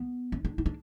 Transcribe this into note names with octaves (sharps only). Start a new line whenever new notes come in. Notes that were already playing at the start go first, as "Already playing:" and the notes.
Already playing: B3
C#4
D4
E4
D4